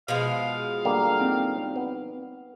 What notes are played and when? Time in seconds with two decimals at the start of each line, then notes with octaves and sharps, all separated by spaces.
0.08 B2 F3 G#3 F5
0.85 D3 G3 A#3
1.20 C4 D#4 G5
1.76 B3